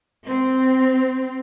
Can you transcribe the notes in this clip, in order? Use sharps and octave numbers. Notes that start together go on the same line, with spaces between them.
C4